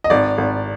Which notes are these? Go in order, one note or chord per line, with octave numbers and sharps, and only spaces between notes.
D#5
G#1 D5
G#1